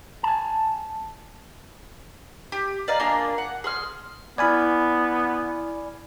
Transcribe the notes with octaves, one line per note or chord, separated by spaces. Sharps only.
G#5 A5
G4
D5 D#5 F5 A#5
A#3 D4 F4 G#4
F#5
G#4 C6 F6
B3 E4 D5 G#5 B5 F6 G#6